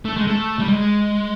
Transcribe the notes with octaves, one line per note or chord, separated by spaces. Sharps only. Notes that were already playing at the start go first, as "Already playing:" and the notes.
A3
G#3
A3
G3
G#3